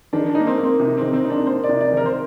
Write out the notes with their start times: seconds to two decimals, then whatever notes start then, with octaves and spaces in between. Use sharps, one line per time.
0.13 D#3 D4
0.29 D4
0.35 D#4
0.40 A#3
0.47 C4
0.57 A#3
0.63 C4
0.80 C3
0.97 D#3 C4
1.13 C4
1.25 D#4
1.30 D4
1.47 A#3 C5
1.64 D5
1.69 C3
1.81 D5
1.92 D#3 A#4
2.06 C5